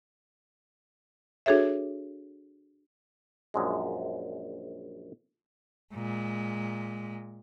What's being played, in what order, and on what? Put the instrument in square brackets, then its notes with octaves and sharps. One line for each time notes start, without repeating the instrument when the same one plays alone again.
[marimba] D4 F#4 G#4 A4 C#5 E5
[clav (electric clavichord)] A#1 F#2 G#3
[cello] A#2 G#3